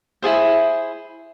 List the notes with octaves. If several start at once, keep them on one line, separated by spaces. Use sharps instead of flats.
E4 F4 G#4 C5